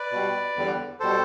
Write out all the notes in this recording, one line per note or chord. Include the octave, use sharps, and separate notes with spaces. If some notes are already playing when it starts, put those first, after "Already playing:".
Already playing: B4 D5
B2 G3
E2 D3 G3
B2 G3 A4 C5